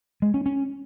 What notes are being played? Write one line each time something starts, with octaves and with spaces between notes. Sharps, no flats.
G#3
C#4
C#4